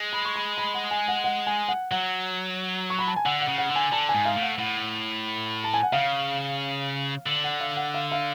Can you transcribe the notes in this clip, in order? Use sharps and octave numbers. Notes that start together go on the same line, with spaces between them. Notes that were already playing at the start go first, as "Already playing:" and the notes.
Already playing: G#3
B5
C#6
B5
B5
F#5
G#5
F#5
F#5
G#5
F#5
F#3 F#5
C#6
B5
A5
G#5
D3 F#5
F#5
C#3
F#5
D3
G#5
D3 A5
G#5
G#2
F5
A2
F#5
A2 F#5
A5
G#5
F#5
C#3 F5
D3
F#5
F5
F#5
F5
F5